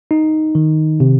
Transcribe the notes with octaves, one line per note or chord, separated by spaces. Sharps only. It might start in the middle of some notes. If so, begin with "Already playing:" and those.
D#4
D#3
C3